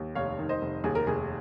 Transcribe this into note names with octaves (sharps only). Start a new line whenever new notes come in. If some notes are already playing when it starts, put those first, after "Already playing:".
Already playing: D#2
F1 C#5 F5
D#3
C5 D#5
F1
D#2 G#4
A#4
F1 G#4